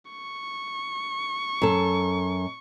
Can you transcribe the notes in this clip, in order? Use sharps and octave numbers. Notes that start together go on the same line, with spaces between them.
C#6
F#2 A4